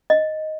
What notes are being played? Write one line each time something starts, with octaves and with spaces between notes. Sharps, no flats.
D#5